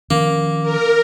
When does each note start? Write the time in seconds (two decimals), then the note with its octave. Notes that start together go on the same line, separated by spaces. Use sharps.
0.11 D#3 F3 A#3 C#4
0.62 A#4